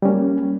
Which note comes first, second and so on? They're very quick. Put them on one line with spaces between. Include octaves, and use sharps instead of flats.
G3 C#4 A#3